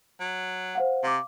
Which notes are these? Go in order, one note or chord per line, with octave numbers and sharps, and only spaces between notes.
F#3
C5 F5 F#5
C3 F5 D6